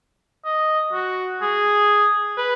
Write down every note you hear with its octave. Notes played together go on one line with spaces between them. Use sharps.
D#5
F#4
G#4
B4